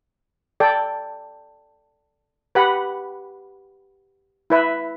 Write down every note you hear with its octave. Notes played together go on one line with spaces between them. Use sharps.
A4 D5 G5
G4 B4 F#5 B5
E4 B4 E5